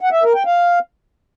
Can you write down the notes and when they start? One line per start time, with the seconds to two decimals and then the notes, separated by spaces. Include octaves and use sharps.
0.01 F#5
0.12 E5
0.23 A#4
0.35 G5
0.46 F5